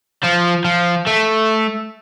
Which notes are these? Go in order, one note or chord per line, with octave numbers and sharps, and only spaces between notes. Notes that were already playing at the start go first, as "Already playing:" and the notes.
F3
F3
A3